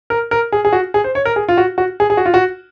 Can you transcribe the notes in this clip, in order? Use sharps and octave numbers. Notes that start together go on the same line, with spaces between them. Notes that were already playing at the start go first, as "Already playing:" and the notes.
A#4
A#4
G#4
G#4
F#4
G#4
C5
C#5
A#4
G#4
F4
F#4
F#4
G#4
G#4
F#4
F4
F#4